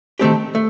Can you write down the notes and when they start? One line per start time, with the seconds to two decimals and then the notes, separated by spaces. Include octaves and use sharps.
0.19 D#3 A3 C4 G4
0.55 A3